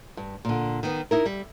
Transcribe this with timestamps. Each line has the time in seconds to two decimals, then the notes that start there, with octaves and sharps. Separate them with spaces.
0.17 G2
0.45 A#2 D3
0.83 D#3 B3
1.11 D#4 E4 A#4
1.25 G3